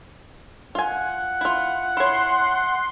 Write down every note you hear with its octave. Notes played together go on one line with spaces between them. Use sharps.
F4 F#5 G#5
E4 F4
E4 C#5 C6